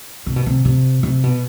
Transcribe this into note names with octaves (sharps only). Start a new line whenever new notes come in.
C3
B2
C3
C3
C3
B2